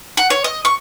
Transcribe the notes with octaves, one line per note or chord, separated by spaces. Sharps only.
F#5
C#5
D#5
C#6